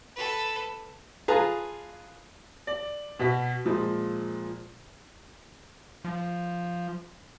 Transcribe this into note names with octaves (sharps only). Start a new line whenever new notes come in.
A4 B4
F4 G#4 B4 F5 A5 A#5
D5
B2 F#4 B6
A#2 F3 G#3
F3